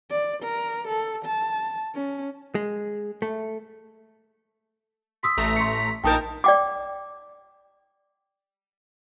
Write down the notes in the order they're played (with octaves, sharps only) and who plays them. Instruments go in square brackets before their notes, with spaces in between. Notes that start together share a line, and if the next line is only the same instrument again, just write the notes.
[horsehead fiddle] D5
A#4
A4
A5
C#4
[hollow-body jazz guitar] G#3
A3
[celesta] C6 D#6 E6 [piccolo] B6
[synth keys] A1 A3 A#5
[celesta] C6 C#6 C#7
[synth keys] A#1 D#4 A#4 [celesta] G5 D#6 G6 [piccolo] A5
[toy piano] D5 G5 D6